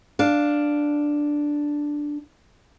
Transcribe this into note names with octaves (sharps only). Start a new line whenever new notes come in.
D4 F5